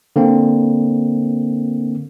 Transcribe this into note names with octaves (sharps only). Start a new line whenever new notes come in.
D3 A#3 C4